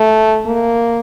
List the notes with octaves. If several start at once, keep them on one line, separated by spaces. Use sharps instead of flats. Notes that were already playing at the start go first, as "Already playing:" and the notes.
Already playing: A3
A#3